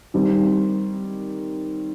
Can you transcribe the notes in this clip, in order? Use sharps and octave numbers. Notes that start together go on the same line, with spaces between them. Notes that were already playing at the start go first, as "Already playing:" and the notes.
D#3 G3 C4